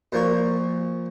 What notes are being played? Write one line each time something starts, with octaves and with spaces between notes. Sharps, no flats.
A#2 F3 A#3 C#6